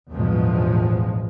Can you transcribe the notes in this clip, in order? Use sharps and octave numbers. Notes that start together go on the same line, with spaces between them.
A1 E2 G2 B2 F3 G#3